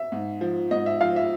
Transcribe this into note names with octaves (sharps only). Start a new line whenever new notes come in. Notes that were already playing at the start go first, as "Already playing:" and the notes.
Already playing: E5
G#2
F3
G#2 D#5
E5
F3 F5
E5